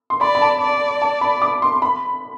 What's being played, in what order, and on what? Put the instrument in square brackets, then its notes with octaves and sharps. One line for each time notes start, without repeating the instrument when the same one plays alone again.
[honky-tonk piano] C6
[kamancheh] D5 [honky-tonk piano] B5
[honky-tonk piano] B5
A5
[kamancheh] D5
[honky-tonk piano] A5
B5
D6
C6
B5